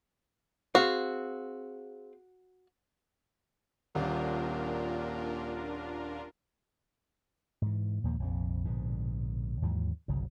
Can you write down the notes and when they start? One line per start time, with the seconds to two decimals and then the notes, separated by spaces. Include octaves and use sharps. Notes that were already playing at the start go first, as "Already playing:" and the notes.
0.75 C4 F#4 G#4 F5
3.95 D#1 A#2 D4 F4 A#4
7.62 G#2 E3
8.04 D#2 A#2 F3 A#3
8.20 A#1 F2 C3
8.65 A#1 G#2 B2 D3
9.62 D#2 G#2 E3 F#3
10.08 G1 C2 C#3 F#3